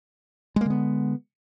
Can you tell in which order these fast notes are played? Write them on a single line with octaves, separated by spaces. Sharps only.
G#3 A#3 D3 B3